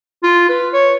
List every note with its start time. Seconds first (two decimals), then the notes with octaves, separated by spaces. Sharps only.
0.23 F4
0.49 B4
0.74 C#5